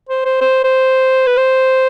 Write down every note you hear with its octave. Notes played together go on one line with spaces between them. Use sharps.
C5
C5
C5
C5
B4
C5